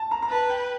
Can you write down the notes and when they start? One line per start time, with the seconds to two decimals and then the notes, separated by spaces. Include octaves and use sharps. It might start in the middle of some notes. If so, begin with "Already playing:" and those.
Already playing: A5
0.11 A#5
0.22 A#5
0.30 B4 A5
0.50 G5